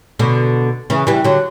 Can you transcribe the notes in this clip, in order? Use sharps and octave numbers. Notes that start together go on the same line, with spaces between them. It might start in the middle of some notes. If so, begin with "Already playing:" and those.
B2 D3
C#3 E3
E3 G3
D3 F#3